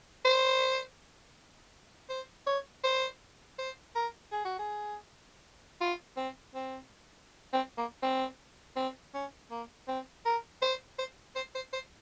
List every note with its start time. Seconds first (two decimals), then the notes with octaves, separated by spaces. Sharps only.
0.25 C5
2.10 C5
2.47 C#5
2.84 C5
3.59 C5
3.95 A#4
4.32 G#4
4.45 F#4
4.59 G#4
5.81 F4
6.17 C4
6.55 C4
7.53 C4
7.78 A#3
8.03 C4
8.76 C4
9.14 C#4
9.51 A#3
9.88 C4
10.25 A#4
10.62 C5
10.99 C5
11.36 C5
11.55 C5
11.73 C5